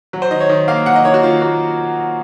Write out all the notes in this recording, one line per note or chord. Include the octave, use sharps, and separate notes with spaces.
F#3
C5
D#3 D#5
C#5
D#3
A#3 F5
F#3 F#5
D#5
D#3 C#5
F#4
D#3 F4
A#3 F#4